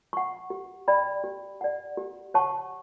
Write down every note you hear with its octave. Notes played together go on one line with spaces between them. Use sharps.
F#5 C#6
G4
D5 G5 B5
G4
D5 F#5
G4
C#5 F#5 A5 C#6